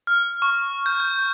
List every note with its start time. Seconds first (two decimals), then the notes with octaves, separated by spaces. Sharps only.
0.07 F6
0.42 C#6
0.86 G6
1.00 G6